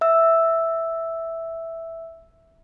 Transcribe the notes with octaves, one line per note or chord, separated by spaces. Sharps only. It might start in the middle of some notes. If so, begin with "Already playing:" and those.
E5 E6